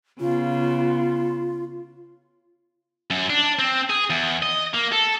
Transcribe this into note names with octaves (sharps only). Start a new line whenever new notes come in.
C#3 B3 F4
F#2
D4
C4
G#4
E2
D#5
A#3
A4